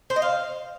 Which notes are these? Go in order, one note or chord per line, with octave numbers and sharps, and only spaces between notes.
C5
D#5
F5